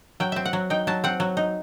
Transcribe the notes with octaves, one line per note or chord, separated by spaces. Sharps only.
F#3 G5
C4 E5
F#5
F#3
D#4 G5
F#3 A5
C4 F#5
F#3
D#4